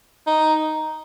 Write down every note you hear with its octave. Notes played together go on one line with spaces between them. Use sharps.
D#4